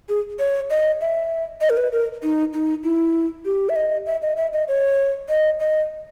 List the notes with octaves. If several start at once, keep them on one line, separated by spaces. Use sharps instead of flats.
G#4
C#5
D#5
E5
D#5
A#4
B4
A#4
D#4
D#4
E4
G4
E5
D#5
E5
D#5
E5
D#5
C#5
D#5
D#5